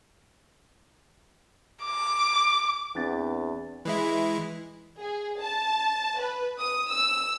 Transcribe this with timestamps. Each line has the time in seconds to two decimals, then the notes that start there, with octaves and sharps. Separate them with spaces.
1.84 D6
2.95 E2 C4 D4 A6
3.85 E3 G#3 E4
4.99 G#4
5.40 A5
6.19 B4
6.59 D#6
6.88 E6